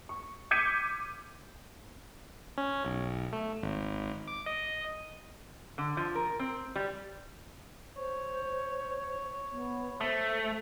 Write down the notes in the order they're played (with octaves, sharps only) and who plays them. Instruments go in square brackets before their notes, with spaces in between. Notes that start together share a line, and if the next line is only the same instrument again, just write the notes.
[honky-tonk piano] C#6
D6 G6 G#6 B6 C#7 D#7
[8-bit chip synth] C#4
B1
A3
G#1
D6
D#5
[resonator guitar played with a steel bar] D3
F3
A#4
C4
G3
[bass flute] C5 [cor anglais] C#5
[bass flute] B3
[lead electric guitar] A3 [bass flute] C5